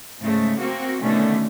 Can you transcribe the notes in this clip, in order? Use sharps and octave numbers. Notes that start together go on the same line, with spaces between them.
G#2 C#3 A3
A#3 C4 F#4
B2 D3 D#3 A3 C#4